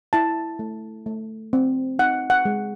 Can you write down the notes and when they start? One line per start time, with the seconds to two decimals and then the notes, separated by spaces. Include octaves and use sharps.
0.13 E4 A5
0.59 A3
1.06 A3
1.53 C4
1.99 D#4 F#5
2.30 F#5
2.45 G#3